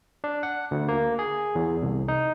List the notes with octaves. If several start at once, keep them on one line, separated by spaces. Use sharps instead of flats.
D4
F#5
D2
A#3
G#4
E2
C2
D#4